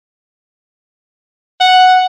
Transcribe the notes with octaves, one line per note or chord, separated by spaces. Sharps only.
F#5